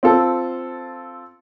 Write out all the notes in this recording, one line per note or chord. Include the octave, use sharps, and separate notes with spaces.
C4 F4 A4